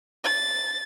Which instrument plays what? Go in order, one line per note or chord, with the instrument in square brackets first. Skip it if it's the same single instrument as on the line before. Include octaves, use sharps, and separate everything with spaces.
[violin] A6